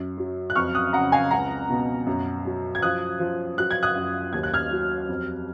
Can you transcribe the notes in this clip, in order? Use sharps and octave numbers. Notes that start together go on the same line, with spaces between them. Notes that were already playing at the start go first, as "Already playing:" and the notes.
Already playing: F#2
F#3
F#6
F2 C#6 F6
D#6 F#6
C#3 F#5 A#5
F5 G#5
C#2 F#5 A#5
B2
F#2
F#3
G#6
F3 D#6 F#6
F3
F#3 F#6
G#6
D#6 F#6
F#2
D#2 G#6
F#6
F6 G#6
F#3
F2